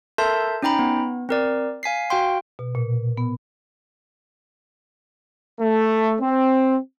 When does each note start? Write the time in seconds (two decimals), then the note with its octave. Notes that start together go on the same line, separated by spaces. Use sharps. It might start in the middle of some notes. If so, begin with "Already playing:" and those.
0.18 A4 A#4 E5 A5 C6 G6
0.62 C#4 D#4 G5 A#5 B5
0.79 B3
1.29 C4 A#4 D5
1.83 F5 G#5 B6 C7
2.10 F#4 F5 G5 C6
2.59 B2
2.75 A#2
3.17 B3
5.60 A3
6.21 C4